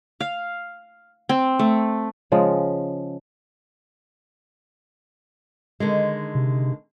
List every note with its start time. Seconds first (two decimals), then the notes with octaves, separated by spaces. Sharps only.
0.20 F5
1.29 C4
1.59 A3
2.32 C#3 F3 G#3
5.80 D3 D#3 G#3
6.35 C3